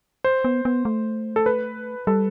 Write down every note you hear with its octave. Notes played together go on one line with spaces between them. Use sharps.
C5
B3
B3
A3
A4
B4
G3 A4